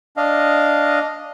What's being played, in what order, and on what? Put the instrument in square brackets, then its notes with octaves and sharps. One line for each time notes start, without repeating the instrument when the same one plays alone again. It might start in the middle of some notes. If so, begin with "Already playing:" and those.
[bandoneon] D4 D#5 F5